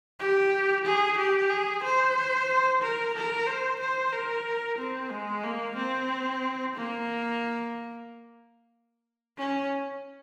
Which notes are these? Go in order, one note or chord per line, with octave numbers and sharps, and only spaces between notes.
G4
G#4
G4
G#4
C5
A#4
A#4
C5
C5
A#4
C4
G#3
A#3
C4
A#3
C#4